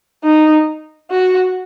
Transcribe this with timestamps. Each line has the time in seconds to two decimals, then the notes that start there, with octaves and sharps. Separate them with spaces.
0.24 D#4
1.10 F#4